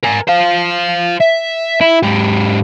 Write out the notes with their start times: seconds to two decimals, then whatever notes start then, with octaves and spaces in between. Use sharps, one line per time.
0.03 A#4 G#5
0.28 C5 F5
1.21 E5
1.81 E4
2.03 G#2 G4